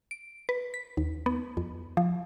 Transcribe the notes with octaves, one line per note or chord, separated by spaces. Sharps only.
D7
B4
B6
D#2
B3
F2
F3